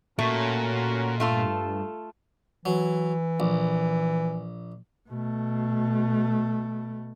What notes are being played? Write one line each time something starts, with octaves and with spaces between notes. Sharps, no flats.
A#2 A3 C#4 F#4 A#4
G2 A3 F4 A4
E3 F#3
A#1
B2 A3